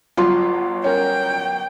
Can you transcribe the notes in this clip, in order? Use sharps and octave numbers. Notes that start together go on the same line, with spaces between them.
G1 F#3 F4 C6
C#4 A#4 G5